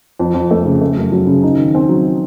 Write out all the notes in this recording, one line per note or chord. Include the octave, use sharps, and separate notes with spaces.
F2
F2
A3
C#3
A3
F#2
F#3
C#3
D#4
D#3
C4
F#3